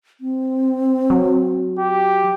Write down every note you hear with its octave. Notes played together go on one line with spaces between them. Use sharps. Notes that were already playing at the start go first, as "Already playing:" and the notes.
C4
F#3
G4